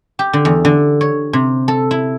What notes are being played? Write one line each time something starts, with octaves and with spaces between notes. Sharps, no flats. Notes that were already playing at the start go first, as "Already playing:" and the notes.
G4
D3
E2
D3
C#5
C3
A4
E4